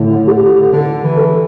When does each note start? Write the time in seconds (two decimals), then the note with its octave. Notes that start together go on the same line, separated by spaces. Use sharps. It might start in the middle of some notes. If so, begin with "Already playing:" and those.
Already playing: A2 D3
0.27 G4
0.73 D3 A4
1.03 E3
1.17 A4